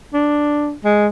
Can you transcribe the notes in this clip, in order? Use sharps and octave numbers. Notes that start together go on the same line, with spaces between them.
D4
G#3